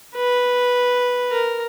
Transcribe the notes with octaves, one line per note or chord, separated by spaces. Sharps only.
B4
A#4